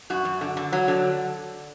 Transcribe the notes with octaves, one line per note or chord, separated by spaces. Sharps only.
F#2 F#4
F#2
D3
D3
F#3
D3